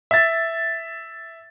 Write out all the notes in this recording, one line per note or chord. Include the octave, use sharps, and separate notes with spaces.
E5 A6